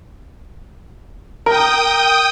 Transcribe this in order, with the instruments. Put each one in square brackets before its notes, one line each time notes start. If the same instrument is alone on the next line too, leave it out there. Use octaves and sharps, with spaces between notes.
[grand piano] A#4 [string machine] G5 D#6